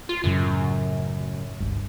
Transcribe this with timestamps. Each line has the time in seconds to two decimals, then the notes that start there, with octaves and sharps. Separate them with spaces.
0.09 F4
0.24 F#2 A2 C#3 F#3
1.60 G1 C#2 G2